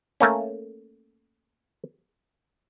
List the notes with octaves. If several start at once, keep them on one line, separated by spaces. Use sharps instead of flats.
A3 A#3 C#4